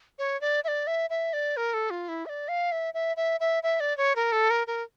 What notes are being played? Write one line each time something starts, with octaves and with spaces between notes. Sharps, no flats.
C#5
D5
E5
D5
E5
E5
D5
A#4
A4
F4
E4
E5
D5
F5
E5
E5
E5
E5
E5
D5
C#5
A#4
A4
A#4
A#4